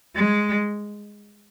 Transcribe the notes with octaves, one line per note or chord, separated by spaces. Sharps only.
G#3